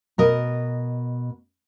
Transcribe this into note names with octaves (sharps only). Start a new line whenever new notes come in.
B2 A#4 D#5